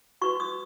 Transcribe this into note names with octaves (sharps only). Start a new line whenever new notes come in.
F#4 B4 C#6
D#6